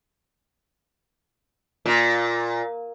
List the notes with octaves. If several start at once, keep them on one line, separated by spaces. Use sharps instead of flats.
A#2